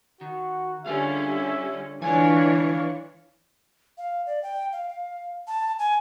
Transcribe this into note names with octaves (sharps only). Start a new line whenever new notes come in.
D#3 F#4
D3 G3 C#4 F4 G#4 E5 F5
G#2 D3 E3 D4 F4 C#5 F5 G#5
F5
D5
G5
F5
F5
A5
G#5